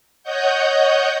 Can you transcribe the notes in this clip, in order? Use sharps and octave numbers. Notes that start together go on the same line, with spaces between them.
C#5 D#5 F#5 G6